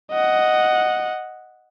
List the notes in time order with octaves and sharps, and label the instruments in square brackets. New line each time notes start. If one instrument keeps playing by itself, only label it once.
[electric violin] D#5 F#5